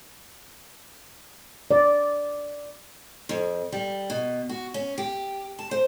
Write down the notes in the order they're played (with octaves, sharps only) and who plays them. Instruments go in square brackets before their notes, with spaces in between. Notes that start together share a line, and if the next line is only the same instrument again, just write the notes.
[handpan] D5
[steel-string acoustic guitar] F2
G3
B2
F#4
C#4
G4
A5
C5